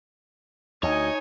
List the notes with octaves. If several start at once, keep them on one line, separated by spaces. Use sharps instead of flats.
D2 D#4 C#5 D#5 G#5